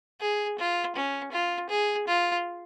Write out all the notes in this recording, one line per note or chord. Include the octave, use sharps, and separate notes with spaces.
G#4
F4
C#4
F4
G#4
F4